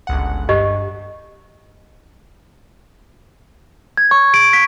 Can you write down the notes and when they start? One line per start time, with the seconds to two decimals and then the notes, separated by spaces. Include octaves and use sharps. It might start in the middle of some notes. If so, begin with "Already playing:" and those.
0.07 G1 C#2 F#5
0.49 G2 G4 D#5
3.97 G#6
4.11 C#6
4.34 D7
4.53 B6